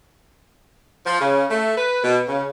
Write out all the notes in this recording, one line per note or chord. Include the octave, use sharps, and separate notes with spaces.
F3
C#3
A3
B4
B2
C#3